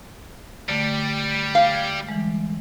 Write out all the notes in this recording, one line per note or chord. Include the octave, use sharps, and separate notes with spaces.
D3 G3 A3
F5
F6 G#6
E3 G3 G#3